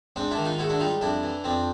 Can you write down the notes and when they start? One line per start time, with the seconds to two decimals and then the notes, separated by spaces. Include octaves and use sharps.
0.16 G#2 C4 D4
0.31 D4 E4
0.37 D#3
0.45 D#4 F4
0.59 G#2 E4 F#4
0.69 D4 E4
0.80 G3 D#4 F4
1.01 F2 D4 E4
1.23 E3
1.44 F2 C4 D4